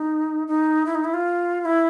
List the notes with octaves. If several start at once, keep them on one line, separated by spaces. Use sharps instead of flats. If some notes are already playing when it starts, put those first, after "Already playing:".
Already playing: D#4
D#4
E4
D#4
E4
F4
F4
E4